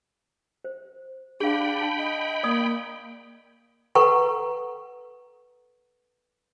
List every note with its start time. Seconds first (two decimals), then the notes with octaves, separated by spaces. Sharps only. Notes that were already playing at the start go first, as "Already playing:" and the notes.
0.64 C5
1.40 D4 G#4 F5 G5 B5
1.81 A5
1.98 D#5
2.43 A#3 D5 D#6
3.95 A4 B4 F#5 A#5 C#6